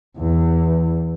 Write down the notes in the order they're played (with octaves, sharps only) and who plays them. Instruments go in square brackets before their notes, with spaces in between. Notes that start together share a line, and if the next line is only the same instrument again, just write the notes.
[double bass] E2